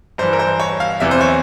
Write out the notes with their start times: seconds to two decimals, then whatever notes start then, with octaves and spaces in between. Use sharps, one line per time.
0.18 G2 E3 C5
0.33 A#4
0.39 C5
0.60 C#5
0.80 F5
1.00 E2 C3 E3 E5
1.11 C5
1.21 C#5